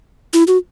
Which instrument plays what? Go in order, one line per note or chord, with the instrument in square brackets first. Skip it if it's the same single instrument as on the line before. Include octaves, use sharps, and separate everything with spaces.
[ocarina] E4
F#4